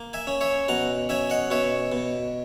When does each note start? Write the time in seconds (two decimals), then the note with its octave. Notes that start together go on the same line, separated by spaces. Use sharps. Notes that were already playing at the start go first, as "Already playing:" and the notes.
Already playing: A#3
0.13 E5 G#5
0.27 C#4
0.41 C#5 E5
0.68 B2 F#5 A#5
1.09 C#4 E5 G#5
1.30 D#5 F#5
1.50 B2 C#5 E5
1.92 B2